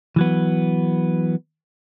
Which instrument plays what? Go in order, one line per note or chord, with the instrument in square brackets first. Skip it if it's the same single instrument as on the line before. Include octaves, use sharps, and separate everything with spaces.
[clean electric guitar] E3 F#3 B3